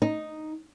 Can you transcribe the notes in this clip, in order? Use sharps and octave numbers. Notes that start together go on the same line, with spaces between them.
D#4